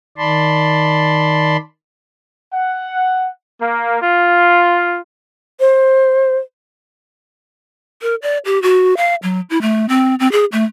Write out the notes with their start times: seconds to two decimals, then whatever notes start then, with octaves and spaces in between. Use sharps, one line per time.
0.18 D#3 D5 A5 B5 C6
2.52 F#5
3.60 A#3
4.02 F4
5.60 C5
8.02 A#4
8.22 D5
8.45 G4
8.62 F#4
8.97 F5
9.23 F#3
9.50 E4
9.62 A3
9.89 C4
10.20 C4
10.32 G#4
10.52 A3